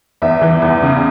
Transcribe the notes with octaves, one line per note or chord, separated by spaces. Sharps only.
E2 E5
E3
E2
C#3